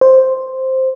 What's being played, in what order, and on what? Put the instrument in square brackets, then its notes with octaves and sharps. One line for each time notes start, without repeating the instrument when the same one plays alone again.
[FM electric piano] C5